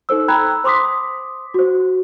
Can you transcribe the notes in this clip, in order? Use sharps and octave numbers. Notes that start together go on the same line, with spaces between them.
D#4 A4 C5 E6
G5 A#5 B5 E6 F#6 G#6
C5 C6 D6 D#6 B6
F#4 C5